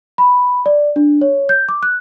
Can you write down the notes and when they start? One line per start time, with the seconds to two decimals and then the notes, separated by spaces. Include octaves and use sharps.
0.18 B5
0.66 D5
0.96 D4
1.21 C#5
1.49 G6
1.69 D6
1.83 F#6